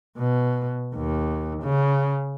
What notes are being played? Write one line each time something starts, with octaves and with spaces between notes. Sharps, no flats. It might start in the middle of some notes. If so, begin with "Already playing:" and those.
B2
D#2
C#3